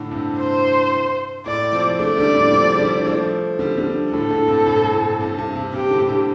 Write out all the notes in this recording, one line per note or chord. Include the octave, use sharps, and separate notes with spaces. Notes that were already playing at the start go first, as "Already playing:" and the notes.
Already playing: A2 D3
G2 C3
C5
A2 D5
C3 F3
A3 D4 D5
D3 G3
A2 D3
C3 F3
A3
D3 G3
F3 A3
D3 G3
D3 G3
A2 D3 A4
A2 D3
G2 C3
A2
A2
G2 C3
G2
G2 C3
G2 C3 G4
A2 D3
G2 C3